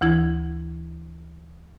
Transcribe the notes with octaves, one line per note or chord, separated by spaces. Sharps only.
D2 E3 E4 G#6